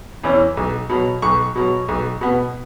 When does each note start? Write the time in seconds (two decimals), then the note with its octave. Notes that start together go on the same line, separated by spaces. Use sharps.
0.24 E2 E3 C#4
0.57 B1
0.90 B2 F#3
1.22 B1 C#6
1.56 B2 F#3
1.88 B1
2.21 B2 B3